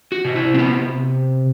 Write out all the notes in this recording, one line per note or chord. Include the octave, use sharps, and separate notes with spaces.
F#4
C3
E4
C4
C3 B3